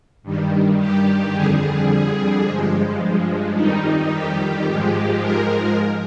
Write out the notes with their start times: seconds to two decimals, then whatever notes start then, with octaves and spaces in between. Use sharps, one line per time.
0.23 G2 D#3 G3
0.78 G4
1.34 F2 D3 G3 G#4
1.90 G#4
2.46 G2 F3 G#3
3.55 F2 D#3 G3 D#4
4.12 G4
4.67 G#2 F3 G#3
5.22 A#4